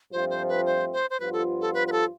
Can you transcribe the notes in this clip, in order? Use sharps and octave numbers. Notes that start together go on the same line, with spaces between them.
G2 F3 A3 C4 F4 C5
C5
B4
C5
C5
C5
G2 F3 B3 F4 B4
A4
A4
B4
B4
A4